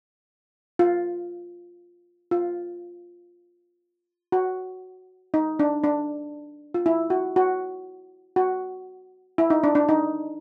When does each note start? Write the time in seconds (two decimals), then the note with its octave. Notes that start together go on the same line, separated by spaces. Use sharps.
0.79 F4
2.31 F4
4.32 F#4
5.34 D#4
5.59 D4
5.84 D4
6.74 F4
6.86 E4
7.10 F#4
7.36 F#4
8.36 F#4
9.38 E4
9.50 D#4
9.64 D4
9.75 D4
9.89 D#4